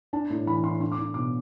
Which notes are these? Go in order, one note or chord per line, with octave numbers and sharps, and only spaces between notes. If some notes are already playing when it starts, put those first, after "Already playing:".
D4 A5
A2
E3 B5
A2 C6
D4 C6
D6
D4
B2 D6